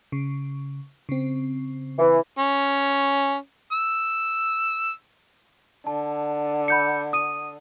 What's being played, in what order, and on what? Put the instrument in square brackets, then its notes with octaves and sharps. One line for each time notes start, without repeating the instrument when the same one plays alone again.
[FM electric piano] C#3
C#3 C4
[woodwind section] E3
[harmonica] C#4
E6
[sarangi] D3 [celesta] A5
[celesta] B5 G6 C#7
D#6 D#7